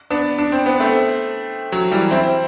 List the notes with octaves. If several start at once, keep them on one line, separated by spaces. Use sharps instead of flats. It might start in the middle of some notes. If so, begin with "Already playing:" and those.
B3 D4
D4
C4
B3
A3 C4
F#3
E3 G3
C4 E4